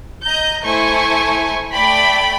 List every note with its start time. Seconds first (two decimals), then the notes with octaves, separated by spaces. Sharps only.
0.23 D#5 A#5 G6
0.62 A3 E4 C5 G#5 C#6
1.72 A3 D5 G5 B5